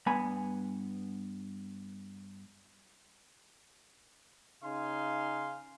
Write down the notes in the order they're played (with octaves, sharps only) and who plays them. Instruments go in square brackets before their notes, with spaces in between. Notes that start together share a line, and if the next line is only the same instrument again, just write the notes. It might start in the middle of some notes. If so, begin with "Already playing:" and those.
[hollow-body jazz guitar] G2 B3 G#5 B5
[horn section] C#3 D#4 F5 G#5 C6